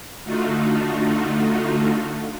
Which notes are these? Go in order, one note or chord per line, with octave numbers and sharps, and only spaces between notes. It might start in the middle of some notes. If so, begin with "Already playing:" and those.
D3 A3 D#4 F4 F#4